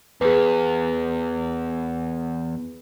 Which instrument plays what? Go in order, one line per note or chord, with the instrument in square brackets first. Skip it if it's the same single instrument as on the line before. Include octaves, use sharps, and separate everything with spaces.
[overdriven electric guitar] E2 [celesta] G#4 B4